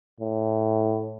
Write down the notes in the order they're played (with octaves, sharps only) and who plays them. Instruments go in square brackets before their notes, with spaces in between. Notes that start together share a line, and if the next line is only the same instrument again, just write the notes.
[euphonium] A2